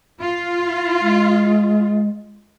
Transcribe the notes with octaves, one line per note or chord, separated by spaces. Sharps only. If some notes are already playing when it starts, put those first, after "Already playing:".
F4
G#3